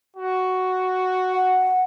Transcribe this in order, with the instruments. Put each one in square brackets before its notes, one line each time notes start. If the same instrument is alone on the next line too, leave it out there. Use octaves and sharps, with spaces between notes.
[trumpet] F#4
[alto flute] F#5